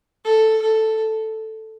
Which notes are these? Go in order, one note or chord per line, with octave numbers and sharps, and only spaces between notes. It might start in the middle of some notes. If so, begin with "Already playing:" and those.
A4
A4